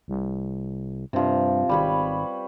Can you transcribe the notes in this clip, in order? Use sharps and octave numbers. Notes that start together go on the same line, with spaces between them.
C2
G2 C3 F3
G#1 G3 B4 C#5